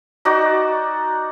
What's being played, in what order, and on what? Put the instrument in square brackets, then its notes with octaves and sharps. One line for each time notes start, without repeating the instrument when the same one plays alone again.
[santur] D#4 F#4 D5